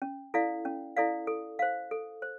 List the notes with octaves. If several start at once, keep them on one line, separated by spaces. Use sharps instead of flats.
C#4
E4 A4 D5 F5
C#4
E4 A4 D5 F5
A4
C5 F5
A4
C5